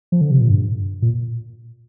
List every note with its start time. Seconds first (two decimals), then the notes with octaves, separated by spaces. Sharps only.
0.12 F3
0.21 D3
0.31 C3
0.41 A#2
0.50 G2
1.02 A#2